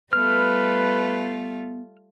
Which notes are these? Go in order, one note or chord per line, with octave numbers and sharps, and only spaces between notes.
G3 A3 B3 F4 B4 F6